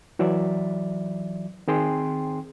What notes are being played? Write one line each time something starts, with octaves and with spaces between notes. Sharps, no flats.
E3 F#3 D5 E5
D#3 C4 G#4 G5 C6